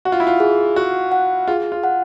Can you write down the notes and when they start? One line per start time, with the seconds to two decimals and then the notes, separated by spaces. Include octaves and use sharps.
0.05 F#4 F#5
0.12 F4
0.20 E4
0.27 F4
0.40 G#4
0.76 F#4 F#5
1.12 F#5
1.48 F4 G#4
1.72 F4
1.84 F#5